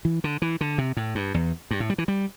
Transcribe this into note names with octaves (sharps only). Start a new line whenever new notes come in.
E3
D3
E3
D3
C3
A2
G2
E2
G2
A2
G3
E3
G3